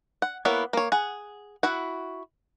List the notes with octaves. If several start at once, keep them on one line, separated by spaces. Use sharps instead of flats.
F#5
A#3 B3 E4 C#5 F#5
A#3 C#5
G#4 F#5
E4 F#4 F#5